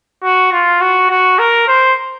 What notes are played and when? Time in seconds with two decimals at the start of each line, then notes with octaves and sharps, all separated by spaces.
0.24 F#4
0.52 F4
0.81 F#4
1.10 F#4
1.39 A#4
1.68 C5